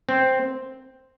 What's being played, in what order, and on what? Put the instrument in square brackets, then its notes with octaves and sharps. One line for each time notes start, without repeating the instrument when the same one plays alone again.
[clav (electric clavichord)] C4